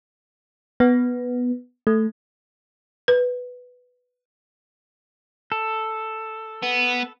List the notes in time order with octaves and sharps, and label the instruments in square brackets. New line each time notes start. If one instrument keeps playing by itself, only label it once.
[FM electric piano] B3
A3
[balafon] B4
[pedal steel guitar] A4
[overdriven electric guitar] B3